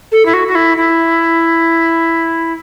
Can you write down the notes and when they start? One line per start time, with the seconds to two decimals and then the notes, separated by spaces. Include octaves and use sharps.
0.11 A4
0.25 E4
0.33 F#4
0.47 F#4
0.55 E4
0.77 E4